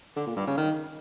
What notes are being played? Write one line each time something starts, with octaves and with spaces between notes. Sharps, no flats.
D3
A#2
G2
C#3
D#3